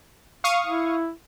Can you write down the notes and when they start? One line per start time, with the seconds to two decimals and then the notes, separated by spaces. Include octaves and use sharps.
0.44 F5 C#6 D#6
0.67 E4